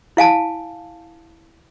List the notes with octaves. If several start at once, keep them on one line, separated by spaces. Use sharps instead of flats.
E4 F5 G#5 A5